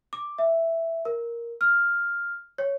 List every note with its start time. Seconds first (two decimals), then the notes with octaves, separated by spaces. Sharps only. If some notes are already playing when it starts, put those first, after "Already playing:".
0.13 D6
0.38 E5
1.05 A#4
1.61 F6
2.58 C#5